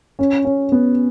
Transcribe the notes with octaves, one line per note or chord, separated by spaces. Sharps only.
C#4
C#4
B3